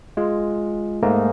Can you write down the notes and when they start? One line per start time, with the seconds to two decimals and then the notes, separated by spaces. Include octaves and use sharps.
0.17 G#3 F4
1.02 G#2 A3 A#3 D#4